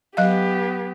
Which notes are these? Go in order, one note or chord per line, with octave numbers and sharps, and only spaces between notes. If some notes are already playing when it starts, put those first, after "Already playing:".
F#3 B3 G4 D#5 F5